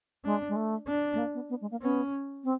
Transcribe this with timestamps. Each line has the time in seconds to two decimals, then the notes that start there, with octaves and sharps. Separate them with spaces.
0.25 G#3 D4
0.49 G#3
0.56 A3
0.87 D4
1.14 A3
1.18 A#3
1.34 B3
1.50 B3
1.61 G#3
1.71 A#3
1.81 B3 C#4
2.44 C4